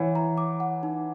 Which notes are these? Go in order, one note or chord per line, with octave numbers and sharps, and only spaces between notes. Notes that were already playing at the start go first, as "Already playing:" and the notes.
Already playing: E3 C#5 F#5
A#5
D6
F#5
D#4